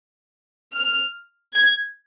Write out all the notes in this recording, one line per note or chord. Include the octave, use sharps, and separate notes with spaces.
F6
G#6